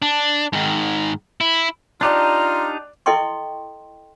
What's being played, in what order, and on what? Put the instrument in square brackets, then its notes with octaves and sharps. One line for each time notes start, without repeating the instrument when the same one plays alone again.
[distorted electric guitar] D4
G#2 D#3
E4
[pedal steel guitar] D4 D#4 G4 [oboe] F4 [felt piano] D5 D6 F#6 [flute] A#5
[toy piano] E4 A4 D#5 G5 C6 C#6